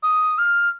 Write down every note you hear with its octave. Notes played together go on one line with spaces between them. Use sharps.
D#6
F6